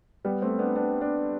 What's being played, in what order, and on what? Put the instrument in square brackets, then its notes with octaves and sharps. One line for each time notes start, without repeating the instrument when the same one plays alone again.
[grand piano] G3 B3
A3 C4
B3 D4
B3 D4
B3 D4